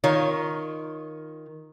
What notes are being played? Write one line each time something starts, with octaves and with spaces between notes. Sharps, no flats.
D#3 F4 C#5